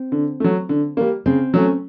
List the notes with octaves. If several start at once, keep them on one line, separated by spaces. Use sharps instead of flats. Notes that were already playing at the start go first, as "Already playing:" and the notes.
Already playing: C4
D3
F#3 A3
D3
G3 A#3
C#3 C4
F#3 A3 C#4